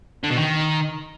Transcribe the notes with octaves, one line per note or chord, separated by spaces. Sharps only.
D3
B2
D#3